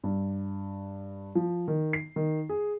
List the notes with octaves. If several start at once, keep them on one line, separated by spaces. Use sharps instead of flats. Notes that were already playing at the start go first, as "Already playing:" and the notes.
G2
F3
D#3
C7
D#3
G#4